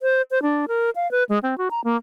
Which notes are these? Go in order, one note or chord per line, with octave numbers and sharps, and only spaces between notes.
C5
C5
D4
A#4
F5
B4
G#3
C4
F#4
A#5
A#3